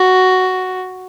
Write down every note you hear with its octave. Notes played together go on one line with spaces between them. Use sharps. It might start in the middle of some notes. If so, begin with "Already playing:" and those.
Already playing: F#4